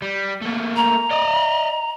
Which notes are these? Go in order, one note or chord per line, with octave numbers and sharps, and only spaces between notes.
G3
A3 A#3
A#5
D5 D#5